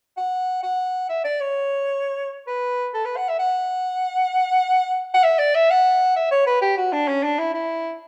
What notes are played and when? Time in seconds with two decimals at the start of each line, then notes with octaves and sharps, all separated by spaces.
0.17 F#5
0.63 F#5
1.09 E5
1.24 D5
1.40 C#5
2.47 B4
2.94 A4
3.05 B4
3.16 F#5
3.28 E5
3.39 F#5
5.14 F#5
5.23 E5
5.39 D5
5.55 E5
5.70 F#5
6.16 E5
6.31 C#5
6.46 B4
6.62 G4
6.78 F#4
6.93 D4
7.08 C#4
7.23 D4
7.39 E4
7.54 E4